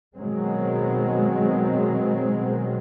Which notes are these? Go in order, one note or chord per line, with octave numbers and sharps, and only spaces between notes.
B2 D#3 F#3 G#3 C4